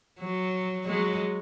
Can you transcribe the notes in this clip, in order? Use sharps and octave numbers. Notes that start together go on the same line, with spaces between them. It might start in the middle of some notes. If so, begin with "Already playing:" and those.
F#3
F#3 G#3